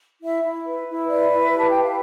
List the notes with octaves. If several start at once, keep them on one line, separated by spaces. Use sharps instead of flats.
E4 E5
E4
B4
E4
B4 D5
E4
B5
G4
A5
B4 G5
F5